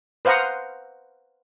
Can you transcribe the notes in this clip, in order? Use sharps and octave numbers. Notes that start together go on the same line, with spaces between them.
B4 C5 F5 F#5 A#5 D#6